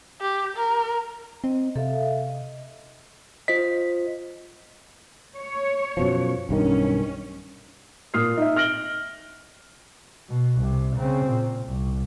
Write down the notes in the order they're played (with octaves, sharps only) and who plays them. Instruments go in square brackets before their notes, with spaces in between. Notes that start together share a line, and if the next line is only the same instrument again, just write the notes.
[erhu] G4
A#4
[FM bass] C4 [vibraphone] D#5
[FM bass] C3 [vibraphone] A4 E5 F5
[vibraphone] D#5
[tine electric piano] F4 C5 D#5 [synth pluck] B6
[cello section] C#5
[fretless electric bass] F#2 B2 F3
[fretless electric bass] B1 G2 D#3 [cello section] C#4
[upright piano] A#2 D#6 F6 C7
D#4 E5
F6 A#6 D7 F#7 G7
[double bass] B2
C2 C3
C#3 C4
A#2
C2